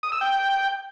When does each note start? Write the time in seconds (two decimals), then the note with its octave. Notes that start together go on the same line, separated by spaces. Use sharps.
0.03 D#6
0.12 E6
0.21 G5